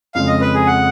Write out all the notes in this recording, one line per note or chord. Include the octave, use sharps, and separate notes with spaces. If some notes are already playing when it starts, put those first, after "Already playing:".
F2 C#3 G#3 F5
D#5
B4
G#4
F#5